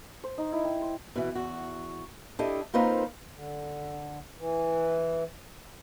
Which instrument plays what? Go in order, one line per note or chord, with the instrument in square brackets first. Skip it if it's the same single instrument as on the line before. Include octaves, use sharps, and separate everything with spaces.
[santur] C5
D#4
E4
G5
C6
[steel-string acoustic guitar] B2 E3
E2 F#4
D4 E4 G4 A4 D#5
A#3 C4 D#4 F4 B4 C5
[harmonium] D3
E3